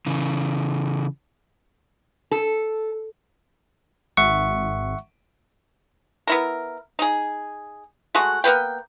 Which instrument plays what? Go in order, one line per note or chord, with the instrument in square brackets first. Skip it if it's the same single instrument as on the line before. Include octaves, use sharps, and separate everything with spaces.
[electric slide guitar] C#3 E3
[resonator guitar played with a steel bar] A4
[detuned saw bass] G#1 [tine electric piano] E5 F#5 C#6
[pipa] B3 E4 A#4
D#4 G#4
G#3 A3 F#4
A#3 B3 B4 G5